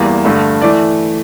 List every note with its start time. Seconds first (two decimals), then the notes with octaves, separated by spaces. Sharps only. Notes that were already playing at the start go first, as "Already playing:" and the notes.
Already playing: E2 E3 G3 A#3
0.25 G2 D3 A3
0.61 E3 A3 D5